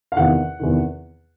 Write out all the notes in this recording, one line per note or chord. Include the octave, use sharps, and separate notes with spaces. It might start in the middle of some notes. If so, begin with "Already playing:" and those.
F5
E2 C3 D#3 F#5
E2 C3 D#3